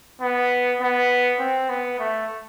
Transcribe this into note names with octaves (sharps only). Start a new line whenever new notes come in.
B3
B3
C4
B3
A3